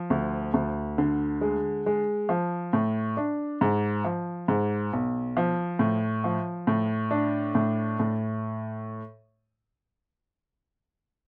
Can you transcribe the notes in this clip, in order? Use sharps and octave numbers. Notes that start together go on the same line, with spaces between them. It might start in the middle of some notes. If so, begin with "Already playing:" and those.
Already playing: F3
D2
D2
D3
G#3
G#3
F3
A2
D4
G#2
F3
G#2
B1
F3
A2
F3
A2
D4
A2
A2